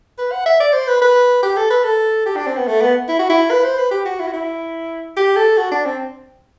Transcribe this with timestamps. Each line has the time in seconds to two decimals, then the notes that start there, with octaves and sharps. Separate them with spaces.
0.18 B4
0.32 F#5
0.45 E5
0.60 D5
0.73 C5
0.87 B4
1.01 B4
1.43 G4
1.57 A4
1.70 B4
1.84 A4
2.26 G4
2.36 D4
2.47 C4
2.56 B3
2.67 A3
2.81 B3
3.08 E4
3.19 F#4
3.29 E4
3.50 B4
3.64 C5
3.78 B4
3.91 G4
4.05 F#4
4.19 E4
4.27 F#4
4.33 E4
5.16 G4
5.36 A4
5.57 F#4
5.72 D4
5.85 C4